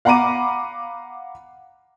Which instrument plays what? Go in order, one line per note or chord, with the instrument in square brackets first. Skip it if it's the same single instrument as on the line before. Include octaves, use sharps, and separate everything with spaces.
[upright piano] F5 F#5 A#5 B5 D6 D#7